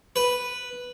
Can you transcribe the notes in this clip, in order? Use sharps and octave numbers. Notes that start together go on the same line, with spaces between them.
B4